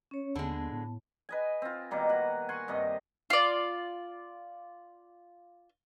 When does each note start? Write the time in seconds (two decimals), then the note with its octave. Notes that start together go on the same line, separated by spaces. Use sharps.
0.11 C#4 C#5
0.36 D#2 D3 G#3 B3 A5
0.72 A2
1.29 B4 D#5 G#5
1.62 C4 F4
1.91 B2 D#3 G3 A#3
2.09 F#4 F#5 G#5
2.49 F#5 G#5 C6 C#6
2.68 G2 C3 D#5
3.30 F4 D5